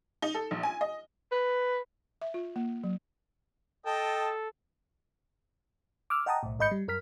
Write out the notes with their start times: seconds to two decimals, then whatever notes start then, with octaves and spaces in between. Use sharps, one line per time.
0.22 D#4
0.34 A4
0.51 A#1
0.63 G#5
0.81 D#5
1.32 B4
2.22 E5
2.34 F4
2.56 A#3
2.84 F#3
3.86 A4 D#5 G5 A5
6.10 D6 E6 F6
6.26 D#5 F#5 G5 A5 A#5 D#6
6.43 B1 A2
6.59 G#1 G#2 D#5 B5 G6 C#7
6.71 G3
6.88 F#2 A#4 F6 B6